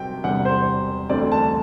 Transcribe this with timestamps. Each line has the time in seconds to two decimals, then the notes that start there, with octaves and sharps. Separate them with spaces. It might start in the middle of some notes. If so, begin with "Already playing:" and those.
Already playing: C3 F#3 G5
0.23 E1 E2 C3 G3 D4 F#5
0.45 C5
1.09 E1 D2 D3 A3 C4 D5
1.32 A5